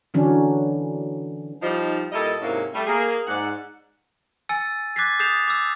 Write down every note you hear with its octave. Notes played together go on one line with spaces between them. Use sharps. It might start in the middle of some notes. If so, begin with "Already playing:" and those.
D3 E3 F#3 C#4 D4
F3 G3 D#4
A#2 G3 E4 A4 D#5
G#2 C3 F#3 A#3 C#4 E4
G3 A3
A#3 G#4
G#2 D5 F#5
G#5 E6 A6 C#7 D#7
D6 F#6 G#6 A6 B6 C7
D#6 G6 A6 C7 E7 F7
D6 E6